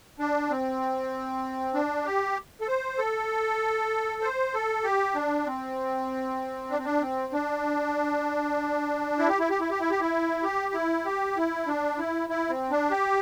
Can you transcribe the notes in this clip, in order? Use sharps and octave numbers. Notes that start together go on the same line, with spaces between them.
D4
C4
D4
G4
A4
C5
A4
C5
A4
G4
D4
C4
D4
C4
D4
C4
D4
E4
G4
E4
G4
E4
G4
E4
G4
E4
G4
E4
G4
E4
D4
E4
E4
C4
D4
G4